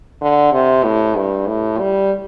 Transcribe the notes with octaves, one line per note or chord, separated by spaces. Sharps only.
D3
C3
A2
G2
A2
G3